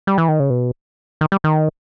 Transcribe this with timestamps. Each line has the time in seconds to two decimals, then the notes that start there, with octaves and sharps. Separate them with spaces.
0.07 G3
0.18 E3
0.28 D#3
0.40 C#3
0.50 B2
1.21 D#3
1.32 G3
1.44 D#3